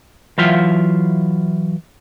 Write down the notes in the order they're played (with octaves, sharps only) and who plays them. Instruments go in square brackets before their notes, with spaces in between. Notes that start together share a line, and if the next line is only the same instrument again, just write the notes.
[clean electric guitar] E3 F#3 F4 E5 F5 G5